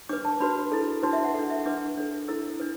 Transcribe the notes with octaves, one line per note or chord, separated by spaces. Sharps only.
D4 B4 D6
A5
D4 F#4 B4 B5
E4 A4
D4 F#4 B4 A5
E5
F#5
D4 A4 F#5
E5
D4 B4 D6
D4 A4
E4 A4 E6
D4 B4